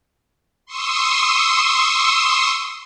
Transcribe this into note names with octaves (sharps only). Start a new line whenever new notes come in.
C6 C#6 D#6 E6